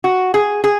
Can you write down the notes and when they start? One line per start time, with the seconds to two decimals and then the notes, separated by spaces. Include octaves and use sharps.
0.04 F#4
0.34 G#4
0.64 G#4